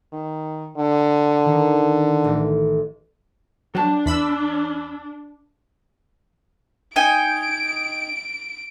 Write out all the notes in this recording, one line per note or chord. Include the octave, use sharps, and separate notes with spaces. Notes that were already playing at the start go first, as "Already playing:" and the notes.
D#3
D3
D#3
A1
F#3 D4 G4 A5
E2 F4 B5 E6
D#4 G5 G#5 D7